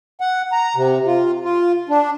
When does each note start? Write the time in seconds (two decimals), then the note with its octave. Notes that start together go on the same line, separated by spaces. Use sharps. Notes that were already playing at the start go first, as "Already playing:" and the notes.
0.21 F#5
0.52 A#5
0.76 C3
1.07 F4
1.45 F4
1.89 D4